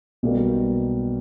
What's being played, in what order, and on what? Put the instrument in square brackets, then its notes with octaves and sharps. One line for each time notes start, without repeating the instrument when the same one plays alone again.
[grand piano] B1 B2 G3 A#3